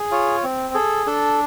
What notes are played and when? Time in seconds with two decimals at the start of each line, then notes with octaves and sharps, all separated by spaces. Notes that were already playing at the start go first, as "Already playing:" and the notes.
Already playing: G#4
0.11 F4 C#5
0.43 C4
0.74 G#4 A4
1.06 D4 A4